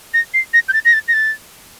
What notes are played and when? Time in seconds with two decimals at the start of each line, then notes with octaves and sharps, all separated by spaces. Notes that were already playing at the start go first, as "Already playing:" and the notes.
0.14 A#6
0.34 C7
0.54 A#6
0.69 G6
0.73 A6
0.85 A#6
0.93 A6
1.08 A#6
1.13 A6